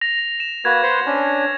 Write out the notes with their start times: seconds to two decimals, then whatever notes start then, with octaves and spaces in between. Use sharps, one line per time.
0.01 A#6 F7
0.40 E7
0.65 A#3 F#4 B4 G#6
0.83 B4 C5 F#5
1.06 C#4 D4